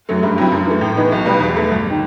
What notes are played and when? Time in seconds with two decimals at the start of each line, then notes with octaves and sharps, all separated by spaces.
0.09 F#2 F#3 A3
0.23 G2
0.38 F#3 C4 E4
0.52 F#2
0.67 E3 A3
0.81 A2
0.97 E3 B3 D#4
1.12 B1
1.26 B2 G3 B3
1.40 E2
1.56 B2 A3
1.71 G1
1.90 D#3